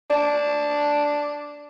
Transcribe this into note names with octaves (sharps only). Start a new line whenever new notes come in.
D4 D5 A5